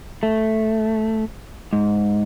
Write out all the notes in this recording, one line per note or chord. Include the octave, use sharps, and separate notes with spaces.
A3
G#2